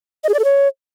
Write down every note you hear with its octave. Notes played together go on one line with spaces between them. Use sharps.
D#5
G#4
D5
A4
C#5